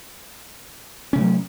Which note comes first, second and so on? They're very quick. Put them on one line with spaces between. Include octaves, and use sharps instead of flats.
C#4 C3 A3 F#3